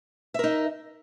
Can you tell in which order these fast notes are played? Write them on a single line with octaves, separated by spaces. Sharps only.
E5 A#4 D#4